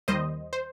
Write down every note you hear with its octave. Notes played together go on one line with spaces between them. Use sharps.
D#2 D#3 G3 C5 D#5
C5